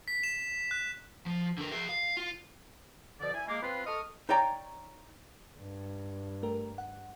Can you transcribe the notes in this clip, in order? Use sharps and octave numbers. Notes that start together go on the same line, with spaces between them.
B6
E7
F#6
F3
D3 A#4
G#4 E5
F5
F4
B2 D3 F3 D5
E4 G#5
G#3 A#3 D6
C4 F4 B4
A4 D#5 C#6 D#6 F6
D#4 C#5 D5 G5 A#5
G2
A3 G4 A#4
F#5